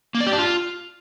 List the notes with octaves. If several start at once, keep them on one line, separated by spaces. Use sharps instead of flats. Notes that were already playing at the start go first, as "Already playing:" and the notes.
A#3
D5
G4
D4
F4